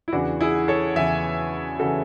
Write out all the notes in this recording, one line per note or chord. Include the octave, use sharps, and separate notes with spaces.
E4
E2 C#3 E3 D4 F#4
E4 G#4
A4 C#5
E2 C#3 E3 E5 G#5
C#3 E3 F#4 A4